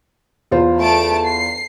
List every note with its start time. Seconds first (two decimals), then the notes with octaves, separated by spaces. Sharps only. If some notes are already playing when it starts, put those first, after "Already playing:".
0.51 E2 F4 C5
0.80 A3 A5 D7
1.25 C7